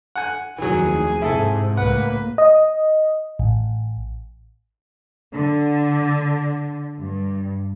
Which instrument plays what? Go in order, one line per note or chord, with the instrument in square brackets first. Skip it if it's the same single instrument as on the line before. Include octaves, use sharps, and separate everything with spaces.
[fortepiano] F#5 G#5 F#6
[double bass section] F1 D#2 D#3 [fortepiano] E3 F#3 [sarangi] G#4
[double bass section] G#2 C3 [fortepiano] E4 A4
[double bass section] C#2 A2 A#3 [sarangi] B4 [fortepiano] F#5
[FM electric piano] D#5
A1
[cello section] D3
G2